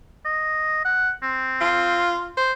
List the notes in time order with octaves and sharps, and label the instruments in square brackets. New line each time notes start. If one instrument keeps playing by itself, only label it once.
[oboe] D#5
F#5
C4
[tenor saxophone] F4
C5